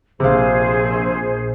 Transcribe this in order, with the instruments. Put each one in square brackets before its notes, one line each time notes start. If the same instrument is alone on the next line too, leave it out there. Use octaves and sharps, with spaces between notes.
[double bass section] A#1 [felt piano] C3 F5 [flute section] G#4 C5